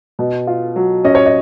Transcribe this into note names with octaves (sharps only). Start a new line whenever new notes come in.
B2
F4
F#3
C#4 D#5
C#5
D#5